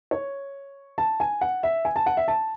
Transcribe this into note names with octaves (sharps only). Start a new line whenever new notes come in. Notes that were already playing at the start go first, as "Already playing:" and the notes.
C#5
A5
G#5
F#5
E5
G#5
A5
F#5
E5
A5